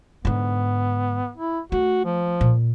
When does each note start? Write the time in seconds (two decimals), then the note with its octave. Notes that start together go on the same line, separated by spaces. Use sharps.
0.25 G#2 D3 B3
1.37 E4
1.72 A3 F#4
2.05 F3
2.41 A#2